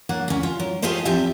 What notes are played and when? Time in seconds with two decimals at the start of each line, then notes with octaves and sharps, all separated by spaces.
0.09 F#3 A#3 D4 F#5
0.28 D2 C#4
0.43 F4
0.60 F#3
0.82 A3 F4 G4 G#4 C5 D#5
1.05 E2 F3 C4 G4 E5